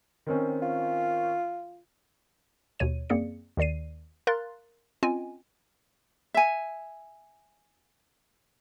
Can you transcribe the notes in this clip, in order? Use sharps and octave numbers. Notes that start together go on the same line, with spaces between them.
D#3 C4 C#4
F4
D#2 B2 C#5 D#7
F#2 A#3 C4 G#4 D5 C#7
D#2 D#3 D5 C7 D#7
A#4 F5 A#5 C6 F#6 A6
C4 C#4 F4 D#5 G5 G#5
E5 G#5